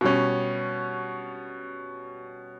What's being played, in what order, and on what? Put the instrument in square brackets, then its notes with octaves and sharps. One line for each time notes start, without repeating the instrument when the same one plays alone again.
[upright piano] B2 G3 C#4